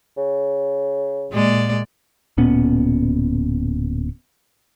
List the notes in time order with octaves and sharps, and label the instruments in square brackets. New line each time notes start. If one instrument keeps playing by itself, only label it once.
[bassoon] C#3
[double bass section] A#2 [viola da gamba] G#3 D5
[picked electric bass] D1 A#2 B3 C#4